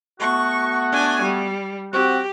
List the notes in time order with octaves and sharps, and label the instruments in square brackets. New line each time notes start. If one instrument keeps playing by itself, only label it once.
[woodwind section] A3 B3 F#4 [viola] C#6
[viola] D4 G#5
G3
[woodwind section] C4 F#4 [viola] G4